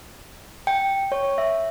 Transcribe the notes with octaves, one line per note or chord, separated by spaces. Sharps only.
G5
C#5
E5